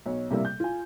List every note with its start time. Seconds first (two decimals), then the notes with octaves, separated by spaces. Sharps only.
0.06 B1 C#5
0.30 C3 G3 A#3 E4
0.45 G6
0.60 F4 G#5